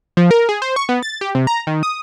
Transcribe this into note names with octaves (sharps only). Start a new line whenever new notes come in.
F3
A#4
G#4
C5
C#6
B3
A6
G4
C3
A#5
D#3
D#6